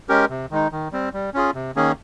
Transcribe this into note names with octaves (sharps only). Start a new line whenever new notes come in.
G#3 C#4 G4 A#4
C3
D#3 G#3 D#4
D#3
G3 C4
G3
C#4 F4 G#4
C3
D#3 A#3 C#4 G#4